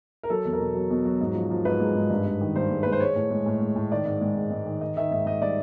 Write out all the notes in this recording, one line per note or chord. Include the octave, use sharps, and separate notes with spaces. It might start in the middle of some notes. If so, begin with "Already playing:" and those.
A#4
F#3 A4
E2
A#4
B2
F#3
B2
F#3
G#2
F3
F3
G#2 B4
G#3
G#2
G2
G2
D#3
G2 C5
G#3
G#3 B4
C5
G#3 C#5
A2
G#3
A2
G#3
A2
D#3 D5
G#2
G#3
G#2
G#2
D#3
D#3 D#5
D#3 E5
G#2 E5
G#2 D#5
G3 D5